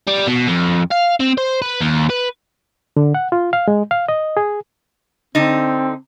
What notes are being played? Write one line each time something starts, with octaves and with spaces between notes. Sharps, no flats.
G3
B2
F2
F5
C4
C5
B4
D#2
B4
D3
F#5
F4
F5
G#3
F5
D#5
G#4
D3 C4 D#4